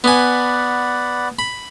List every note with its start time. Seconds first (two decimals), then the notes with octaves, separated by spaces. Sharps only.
0.04 B3 D5 F#5 G#5 B5
1.39 B5